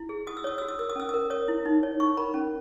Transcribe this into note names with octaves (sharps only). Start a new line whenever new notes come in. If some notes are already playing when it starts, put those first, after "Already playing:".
Already playing: E4
G#4
F#4 D#6
E6
C#5 D#6
F#4 E6
D#6
A#4 E6
D#6
C#4 E6
A#4 D#6
C#5 D#6
E4
D#4
C#5
D#4 C#6
A#4 B5
C#4